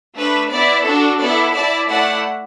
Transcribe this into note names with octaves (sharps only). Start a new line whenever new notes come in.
A3 D4 B4
B3 E4 D5
D4 F#4 A4
B3 E4 A4 D5
E4 D5 A5
A3 E4 D5 F#5 A5